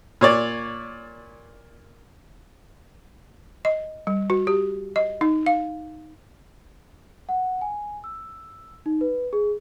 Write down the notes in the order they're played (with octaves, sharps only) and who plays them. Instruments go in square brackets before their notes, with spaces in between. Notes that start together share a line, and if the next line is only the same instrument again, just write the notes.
[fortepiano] A#2 C#5 D5
[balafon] D#5
G3
F#4
G4
D#5
D#4
F5
[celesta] F#5
G#5
E6
D#4
B4
G#4